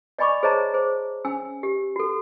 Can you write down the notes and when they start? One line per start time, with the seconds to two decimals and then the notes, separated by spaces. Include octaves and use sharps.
0.18 D5 D#5 G#5 B5 C#6 D6
0.43 G#4 C5 C#5 D#5 A5 A#5
0.74 G#4 C5
1.25 C#4 G#5 E6
1.63 G4
1.96 F#4 A4